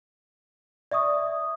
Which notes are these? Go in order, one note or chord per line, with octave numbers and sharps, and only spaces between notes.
D5 E5 C#6 D#6